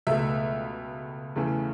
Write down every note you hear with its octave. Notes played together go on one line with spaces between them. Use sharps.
C#2 B2 A3 E5
E2 C#3 E3 A3